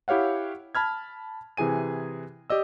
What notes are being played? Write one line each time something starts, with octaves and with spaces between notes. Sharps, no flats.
E4 G4 C#5 F5 F#5
A5 B5 F6 G#6
C3 E3 G#4 G#5 D#7
G4 D5 D#5 E6